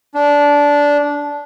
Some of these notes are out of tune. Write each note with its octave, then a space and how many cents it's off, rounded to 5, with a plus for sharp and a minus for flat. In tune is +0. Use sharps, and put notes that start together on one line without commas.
D4 -15